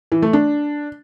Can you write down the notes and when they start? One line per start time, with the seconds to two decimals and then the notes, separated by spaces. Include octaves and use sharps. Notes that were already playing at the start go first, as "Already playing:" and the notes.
0.12 E3
0.22 A3
0.33 D4